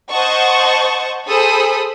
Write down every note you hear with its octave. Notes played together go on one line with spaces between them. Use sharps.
C5 D#5 F#5 A5 C#6
G#4 A4 C5 B5 D#6